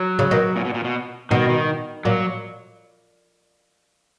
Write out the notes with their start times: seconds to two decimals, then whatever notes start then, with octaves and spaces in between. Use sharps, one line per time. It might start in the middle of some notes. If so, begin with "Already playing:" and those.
Already playing: F#3
0.19 C#3
0.31 B2 D#3
0.56 A#2
0.65 B2
0.74 A#2
0.84 B2
1.31 B2 D#3
1.49 D#3
2.05 A#2 F#3